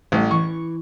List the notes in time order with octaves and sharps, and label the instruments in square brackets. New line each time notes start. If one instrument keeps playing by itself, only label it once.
[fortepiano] A1 [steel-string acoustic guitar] G3
[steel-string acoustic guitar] E3 [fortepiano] C#6